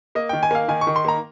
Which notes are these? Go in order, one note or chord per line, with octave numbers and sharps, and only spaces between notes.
A#3 D#5
D#3 G5
G#5
A#3 F5
D#3 G#5
C#6
D#3
C6
A#3 A#5